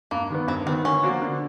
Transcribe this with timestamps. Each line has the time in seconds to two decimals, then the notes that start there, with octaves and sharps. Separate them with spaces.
0.11 G2 A#3
0.30 D#3 G3 B3
0.48 G2 C4
0.66 D#3 G3 B3 C4
0.84 D3 C#4
1.03 F3 A#3 D4 F#4
1.22 D3